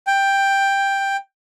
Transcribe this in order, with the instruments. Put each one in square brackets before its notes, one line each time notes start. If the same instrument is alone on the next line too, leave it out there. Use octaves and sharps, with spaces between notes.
[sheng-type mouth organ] G5